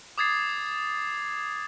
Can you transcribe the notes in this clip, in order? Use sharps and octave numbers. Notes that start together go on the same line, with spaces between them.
D6 D#6 G#6 A6 C7